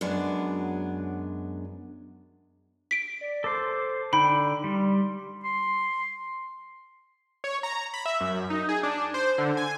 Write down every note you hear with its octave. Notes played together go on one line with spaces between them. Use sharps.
F#2 F#3 G#3 B3 D4
B6 D7
D5
A4 C5 D6
D3 D#4 G5 B5
G3 C6
C6
C#5
A#5
B5
E5
F#2
D#4
G#4
D4
C5
D3
G#5